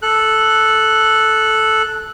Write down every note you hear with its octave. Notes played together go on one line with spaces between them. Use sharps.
A4 F#6